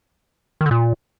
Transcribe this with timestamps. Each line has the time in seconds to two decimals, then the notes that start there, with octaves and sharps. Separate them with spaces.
0.61 D#3
0.66 D3
0.71 A#2